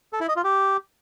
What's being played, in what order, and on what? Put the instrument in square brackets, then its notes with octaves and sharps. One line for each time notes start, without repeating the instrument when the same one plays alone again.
[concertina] A4
E4
D#5
F4
G4